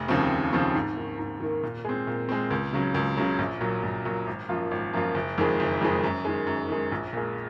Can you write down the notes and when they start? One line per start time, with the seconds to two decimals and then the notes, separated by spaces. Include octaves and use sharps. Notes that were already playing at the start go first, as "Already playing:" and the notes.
Already playing: F1
0.08 D#2 C#3 F3 C4
0.31 F1
0.53 D#2 C#3 F3 C4
0.74 G#2
0.96 D#3 A#3
1.19 G#2
1.40 D#3 A#3
1.63 A#2
1.85 G#3 C4
2.07 A#2
2.29 G#3 C4
2.51 C#2
2.73 C#3 F#3
2.95 C#2
3.17 C#3 F#3
3.39 A#1
3.61 A#2 F#3
3.83 A#1
4.05 A#2 F#3
4.27 G#1
4.49 F#2 F3 A#3 F4
4.71 G#1
4.93 F#2 F3 A#3 F4
5.15 F#1
5.38 F2 D#3 G#3
5.60 F#1
5.81 F2 D#3 G#3
6.04 F#2
6.25 D#3 G#3
6.47 F#2
6.69 D#3 G#3
6.92 A#1
7.13 A#2 G#3